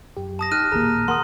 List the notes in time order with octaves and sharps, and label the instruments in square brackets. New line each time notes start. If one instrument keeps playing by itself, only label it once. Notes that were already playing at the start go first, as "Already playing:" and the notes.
[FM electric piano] F#2 G4
[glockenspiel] A5 D#6 A#6
[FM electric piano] D#4 G4 [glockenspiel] F6 F#6 D#7
[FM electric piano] A1 D#2 A#2 [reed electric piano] A#3 G#4 [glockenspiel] A#5
[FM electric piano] D#2 A#3 [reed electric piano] F#5 A#5 D#6 [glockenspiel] C6